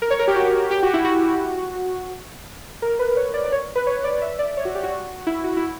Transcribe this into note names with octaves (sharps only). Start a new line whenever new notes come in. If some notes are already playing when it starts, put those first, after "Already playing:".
A#4
C#5
A#4
G4
F#4
G4
F#4
E4
F#4
A#4
B4
C#5
D5
D5
C#5
B4
C#5
D5
E5
D5
C#5
F#4
G4
F#4
E4
F#4
E4